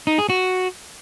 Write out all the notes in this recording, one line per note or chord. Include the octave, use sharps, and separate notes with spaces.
D#4
G#4
F#4